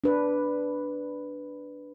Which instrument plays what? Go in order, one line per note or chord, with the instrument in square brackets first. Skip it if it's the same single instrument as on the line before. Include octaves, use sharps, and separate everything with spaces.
[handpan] D4 B4